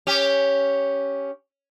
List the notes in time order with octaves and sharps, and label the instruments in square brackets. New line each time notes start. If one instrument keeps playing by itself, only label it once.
[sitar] C#4 G4